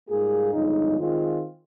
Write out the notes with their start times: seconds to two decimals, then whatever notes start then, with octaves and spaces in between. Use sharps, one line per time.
0.09 G#2 G3 A#3 F4 G#4
0.53 G1 F2 C#3 G#3 D#4
0.98 D#3 G#3 C4 F4